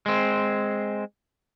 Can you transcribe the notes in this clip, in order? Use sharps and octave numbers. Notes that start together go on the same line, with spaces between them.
G#3 C4